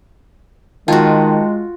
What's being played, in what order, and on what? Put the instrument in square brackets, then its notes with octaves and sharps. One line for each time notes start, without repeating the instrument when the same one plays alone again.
[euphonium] D#3 [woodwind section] G#3 [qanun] F4 F#4 [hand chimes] G5 A5